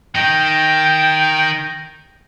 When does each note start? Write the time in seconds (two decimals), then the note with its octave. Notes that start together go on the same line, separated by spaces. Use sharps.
0.15 D#3 D#4 G5